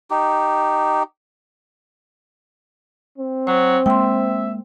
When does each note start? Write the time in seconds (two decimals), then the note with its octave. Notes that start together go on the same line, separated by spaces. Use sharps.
0.10 D#4 G4
3.18 C4
3.47 F#3 C5
3.86 G#3 A#3 E5 G5 C6